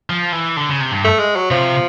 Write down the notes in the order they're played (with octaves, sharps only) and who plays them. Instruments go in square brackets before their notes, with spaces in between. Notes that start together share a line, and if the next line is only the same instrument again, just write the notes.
[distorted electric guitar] F3
E3
D3
C#3
C3
G2
[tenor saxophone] A3
G#3
F#3
[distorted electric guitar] C3 [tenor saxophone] F3